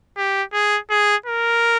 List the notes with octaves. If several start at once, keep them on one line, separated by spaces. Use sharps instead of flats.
G4
G#4
G#4
A#4